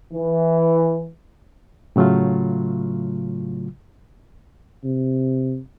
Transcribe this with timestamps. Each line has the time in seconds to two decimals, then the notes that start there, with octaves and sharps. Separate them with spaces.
0.13 E3
1.96 A2 C#3 F#3 A3 F4
4.84 C3